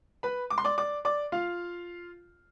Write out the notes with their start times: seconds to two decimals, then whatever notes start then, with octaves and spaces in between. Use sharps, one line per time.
0.23 B4 B5
0.50 D6
0.58 C6
0.64 D5 D6
0.78 D5 D6
1.05 D5 D6
1.32 F4 F5